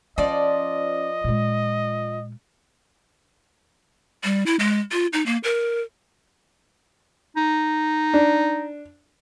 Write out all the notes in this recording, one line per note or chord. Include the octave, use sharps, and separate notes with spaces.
F3 C#4 D5 D#5
A#2 G#3
G3
E4
G#3
F4
D#4
A#3
A#4
D#4
D4